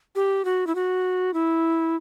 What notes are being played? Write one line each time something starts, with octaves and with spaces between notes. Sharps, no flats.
G4
F#4
E4
F#4
E4